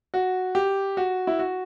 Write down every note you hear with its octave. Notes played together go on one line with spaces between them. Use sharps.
F#4
G4
F#4
E4
F#4